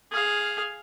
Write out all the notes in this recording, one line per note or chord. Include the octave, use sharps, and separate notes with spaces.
G#4 F5